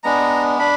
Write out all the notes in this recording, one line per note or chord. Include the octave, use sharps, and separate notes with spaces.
G#3 B3 D4 A#5
D4 B5